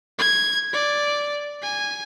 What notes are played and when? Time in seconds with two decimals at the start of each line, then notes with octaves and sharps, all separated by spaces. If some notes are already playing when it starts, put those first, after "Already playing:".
0.19 G#6
0.73 D5
1.63 G#5